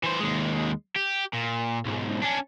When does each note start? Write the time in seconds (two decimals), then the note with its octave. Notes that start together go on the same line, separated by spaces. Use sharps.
0.03 E3 C5
0.20 D#2 G#3
0.96 G4
1.33 A#2
1.85 B1 G#2
2.22 C#4 D4